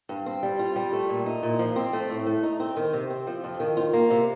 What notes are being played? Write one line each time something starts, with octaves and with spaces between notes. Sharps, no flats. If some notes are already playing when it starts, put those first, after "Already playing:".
G2
C4
G3
F4
G3
A3
A#2
D#4
A#2
F3
C4
A3
A2
A3
D#4
C4
D#3
C3
C4
F3
F2
D#3
F4
A#3
C3